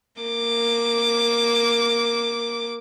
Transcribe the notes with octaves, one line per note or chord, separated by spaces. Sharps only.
A#3 D6